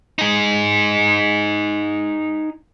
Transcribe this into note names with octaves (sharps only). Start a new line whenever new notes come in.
D#4 G#4